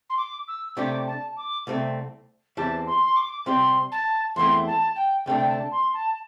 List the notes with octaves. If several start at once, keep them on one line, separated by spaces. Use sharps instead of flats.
C6
D6
E6
C3 A3 D4 G4 D6
A5
D6
C2 C3 A3 C4
E2 E3 C4 G4 A5
C6
C6
D6
C3 G3 C4 G4 C6
A5
E2 E3 A3 C4 E4 C6
A5
G5
D2 C3 A3 D4 G5
G5
A5
C6
A5